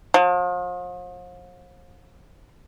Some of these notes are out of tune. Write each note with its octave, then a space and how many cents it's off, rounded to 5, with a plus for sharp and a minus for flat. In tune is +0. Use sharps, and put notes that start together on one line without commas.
F3 +40